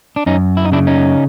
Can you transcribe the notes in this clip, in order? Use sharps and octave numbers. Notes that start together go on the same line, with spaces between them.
D4
F#2 C#4 D#4
E4
D#4
C#3 D4 E4
C#4 D#4